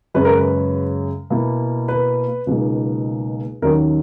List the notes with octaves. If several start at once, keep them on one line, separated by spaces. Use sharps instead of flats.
F#2 C#3 G#3 C#4 B4
A#4
B4
B2 A#3 E4
B4
C#2 B2 F#3 A#3 D#4
D#2 D#3 F#3 C#4 A#4